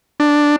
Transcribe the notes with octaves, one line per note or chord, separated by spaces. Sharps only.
D4